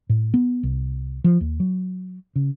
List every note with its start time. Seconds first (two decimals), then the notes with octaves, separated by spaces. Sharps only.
0.09 A2
0.34 B3
0.63 C2
1.24 F3
1.41 D#2
1.60 F#3
2.36 C#3